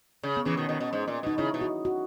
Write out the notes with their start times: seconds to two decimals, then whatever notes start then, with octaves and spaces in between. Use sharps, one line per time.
0.23 C#3
0.37 B3
0.45 C#3 E3 C#4
0.57 B2 D#3
0.69 B2 D#3
0.80 B2
0.93 G#2
1.08 A#2
1.23 B2 D#4
1.38 C#3 E4
1.54 B2
1.61 F#4
1.85 F#4